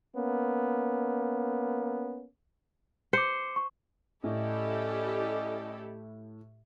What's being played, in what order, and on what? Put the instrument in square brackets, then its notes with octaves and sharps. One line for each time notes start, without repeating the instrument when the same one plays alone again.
[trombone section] A#3 B3 C#4
[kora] C5 [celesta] D6 C#7
[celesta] C#6
[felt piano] A2 [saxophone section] C#4 D5 D#5 [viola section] E4 G4 A4